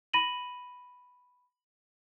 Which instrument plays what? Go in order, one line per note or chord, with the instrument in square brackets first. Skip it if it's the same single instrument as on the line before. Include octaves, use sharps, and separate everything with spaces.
[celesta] B5 A#6 D#7 F#7